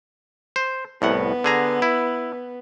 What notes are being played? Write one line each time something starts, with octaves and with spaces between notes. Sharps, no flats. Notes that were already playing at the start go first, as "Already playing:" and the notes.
C5
C2 A2 B3 F#5
D3 G#4 A#5
E4